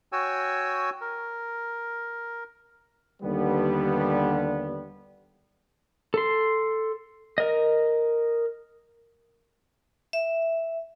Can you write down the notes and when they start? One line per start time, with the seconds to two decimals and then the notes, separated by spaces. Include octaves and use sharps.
0.12 F#4 C#5 G5 G#5 E6
1.01 A#4
3.23 D#2 D3 G3 B3
6.14 A4 C6
7.38 A#4 D#5
10.13 E5